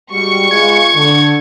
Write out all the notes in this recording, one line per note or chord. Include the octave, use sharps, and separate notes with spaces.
G3 G#3 F#4 C#6
G#3 B3 F4 G#6
D3